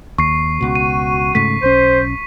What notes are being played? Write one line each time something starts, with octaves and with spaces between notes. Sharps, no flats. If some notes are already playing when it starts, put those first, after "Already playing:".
D#2 C#6 C7
C#2 B2 F#4
D#7
G#2 C#3 A3 B6
B1 C#4 C5